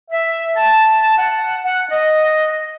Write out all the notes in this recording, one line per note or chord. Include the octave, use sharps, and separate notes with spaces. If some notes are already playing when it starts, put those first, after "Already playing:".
E5
A5
F#5
F#5
D#5